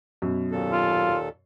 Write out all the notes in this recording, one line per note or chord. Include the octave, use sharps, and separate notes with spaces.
F#2 B2
D#2 A#2 A4
F4